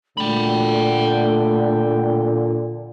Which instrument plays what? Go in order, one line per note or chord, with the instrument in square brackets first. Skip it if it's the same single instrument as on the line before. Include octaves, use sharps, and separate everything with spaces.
[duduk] A#2 [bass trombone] D3 [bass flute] A3 [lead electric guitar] G5 B5